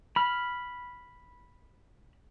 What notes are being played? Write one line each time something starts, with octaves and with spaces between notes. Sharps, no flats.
B5 F6